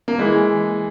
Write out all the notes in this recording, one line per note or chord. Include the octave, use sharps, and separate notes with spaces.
A#3
E3 G#3